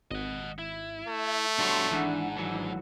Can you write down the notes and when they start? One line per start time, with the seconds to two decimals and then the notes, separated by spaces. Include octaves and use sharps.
0.11 G#1 D#5 F#5
0.59 E4
1.08 A3
1.59 B2 G3 D4 F#4 C#5 A5 C6
1.91 G#1 G#2 E3 D4 F#5
2.37 E3 F#3